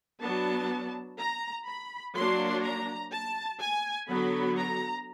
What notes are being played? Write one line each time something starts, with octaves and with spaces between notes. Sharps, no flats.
F#3 B3 D4 A5
A#5
B5
F#3 A#3 D4 C6
A#5
A5
G#5
D3 F#3 B3 B5
A#5